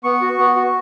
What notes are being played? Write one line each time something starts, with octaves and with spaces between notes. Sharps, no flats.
B3 C#6
F#4
B3
F#4